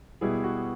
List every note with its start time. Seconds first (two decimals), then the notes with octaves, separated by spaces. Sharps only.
0.21 B2 G3 B3 E4 G#4
0.44 F#4